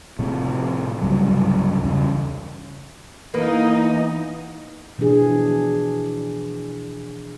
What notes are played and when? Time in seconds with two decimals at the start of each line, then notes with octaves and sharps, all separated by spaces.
0.19 A2 C3 F3
1.01 C2 G2 C#3 F#3
1.84 E2 C#3 G3
3.34 E3 A#3 B3 D#4 B4 D#5
4.98 B2 E3 F3 D4 G#4